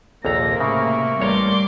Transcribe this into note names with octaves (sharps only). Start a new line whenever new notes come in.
A#1 D#2 C3 A#3 A4 A#5 A#6
A2 C#3 E5 C#6
A1 G3 A3 A#3 C#5 A#5 C6 D6